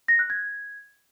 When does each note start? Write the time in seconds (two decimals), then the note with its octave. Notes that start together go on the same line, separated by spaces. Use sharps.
0.08 A#6
0.19 F#6
0.30 G#6